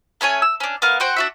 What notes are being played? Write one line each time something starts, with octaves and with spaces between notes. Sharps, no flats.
A3 C#4 C#5 G#5
E6
C#4 D4
B3 A#4 F5
F#4 C5 F#5 G5
D4 F#4 E5